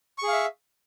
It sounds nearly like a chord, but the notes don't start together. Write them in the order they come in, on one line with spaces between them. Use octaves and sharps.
C#6 G#4 F5 E5